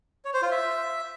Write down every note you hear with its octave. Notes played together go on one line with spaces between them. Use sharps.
C#5
C5
F4
E5